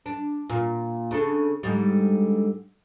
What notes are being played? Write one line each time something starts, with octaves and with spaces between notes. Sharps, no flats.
D4
A#2
C#3 D4 A4
G#2 D3 G3